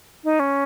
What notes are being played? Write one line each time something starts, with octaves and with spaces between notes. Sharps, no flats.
D#4
C#4